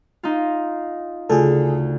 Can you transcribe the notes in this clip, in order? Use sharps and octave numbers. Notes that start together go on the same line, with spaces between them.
D#4 F4
D2 C#3 F4 G#4 A4